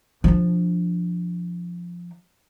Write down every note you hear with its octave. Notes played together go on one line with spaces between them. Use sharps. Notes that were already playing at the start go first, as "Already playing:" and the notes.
F3 D4